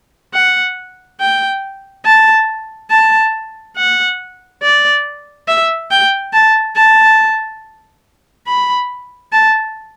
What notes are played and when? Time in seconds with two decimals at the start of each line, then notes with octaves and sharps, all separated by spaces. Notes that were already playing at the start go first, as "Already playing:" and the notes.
0.34 F#5
1.20 G5
2.05 A5
2.90 A5
3.77 F#5
4.62 D5
5.48 E5
5.90 G5
6.33 A5
6.76 A5
8.47 B5
9.32 A5